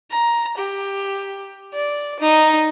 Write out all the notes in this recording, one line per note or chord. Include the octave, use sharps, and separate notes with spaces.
A#5
G4
D5
D#4